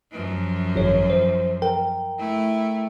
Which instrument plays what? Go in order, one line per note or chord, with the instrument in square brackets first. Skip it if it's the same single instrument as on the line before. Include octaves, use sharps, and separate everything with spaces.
[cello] F#2 F3
[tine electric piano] G#1 C#5
C5
A#4 G5
[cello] A3 E4